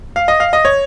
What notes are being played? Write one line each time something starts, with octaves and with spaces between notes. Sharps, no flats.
F5
D#5
F5
D#5
C#5